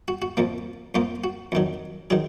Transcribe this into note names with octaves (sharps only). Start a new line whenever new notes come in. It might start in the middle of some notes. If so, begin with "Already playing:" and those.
F#4
F#4
F2 F3 A#3
F2 F3 A#3 F4
F#4
F2 D#3 F#3
D#3 F#3 G#4